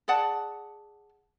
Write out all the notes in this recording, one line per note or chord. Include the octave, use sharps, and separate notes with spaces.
G#4 D5 F#5 A5